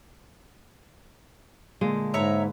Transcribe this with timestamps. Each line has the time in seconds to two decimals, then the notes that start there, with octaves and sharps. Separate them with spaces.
1.81 A#2 D3 G#3
2.14 G#2 B4 C#5 E5 A#5